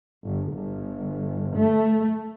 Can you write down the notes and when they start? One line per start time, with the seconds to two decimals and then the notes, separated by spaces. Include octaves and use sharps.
0.25 G1
0.54 G1
1.57 A3